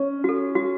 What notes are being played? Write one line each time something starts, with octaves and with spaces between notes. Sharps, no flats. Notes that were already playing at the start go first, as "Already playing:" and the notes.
Already playing: C#4
F#4 A4
F#4